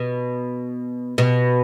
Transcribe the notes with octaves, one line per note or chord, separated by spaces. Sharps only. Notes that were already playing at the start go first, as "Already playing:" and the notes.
Already playing: B2
B2